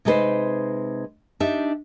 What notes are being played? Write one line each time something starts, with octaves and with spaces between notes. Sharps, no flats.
C3 G#3 D#4 A4 B4 C5
D4 D#4 G4 E5